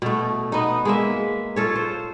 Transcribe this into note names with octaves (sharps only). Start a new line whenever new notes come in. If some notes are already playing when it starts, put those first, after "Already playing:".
B2 A3
B3 D#4
G#3 A#3 E5
F4 A4 C#5
C5